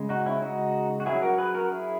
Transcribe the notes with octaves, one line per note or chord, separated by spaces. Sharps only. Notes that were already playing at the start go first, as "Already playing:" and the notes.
Already playing: C#3 G#3
D#4 F#4
C#4 E4
D#4 F#4
F#4
F#3 C#4 E4 G#4
F#4 A#4
G#4 B4
F#4 A#4
E4 G#4